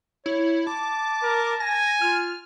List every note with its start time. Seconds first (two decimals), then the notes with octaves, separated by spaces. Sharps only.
0.26 E4 C#5
0.67 A5 D6
1.23 A#4
1.60 G#5 A#6
2.01 F4 F6